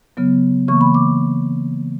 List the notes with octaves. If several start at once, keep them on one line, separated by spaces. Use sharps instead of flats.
C#3 F#3 B3
C#3 E3 A#3 C#6
B5
D6